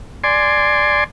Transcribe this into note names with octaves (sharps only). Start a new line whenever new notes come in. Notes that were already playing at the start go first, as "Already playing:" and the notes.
D5 G#5 C6